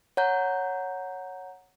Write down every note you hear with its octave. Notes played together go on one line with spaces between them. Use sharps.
C#5 F#5 A#5 G6